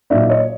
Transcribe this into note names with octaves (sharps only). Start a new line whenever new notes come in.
A#2 F#3 A#3 D#4 D5 E5
C#5 D#5